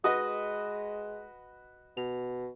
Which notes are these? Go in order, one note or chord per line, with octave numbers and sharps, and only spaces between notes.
G#3 F#4 B4 D#5 D#6
B2 F7